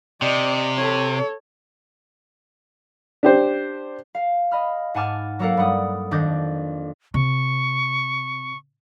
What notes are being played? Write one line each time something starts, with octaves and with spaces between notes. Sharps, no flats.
C3 D5 D#5
A4 C#5
D4 G4 C5
F5
D#5 B5 F6
G#2 F#5 G#5 A5 D6 F6
F#3 A#3 A4 A#4 F5 F#5
G2 G3 F#5 D#6
F2 D#3 D4 D6 G6 A#6
C3 C#6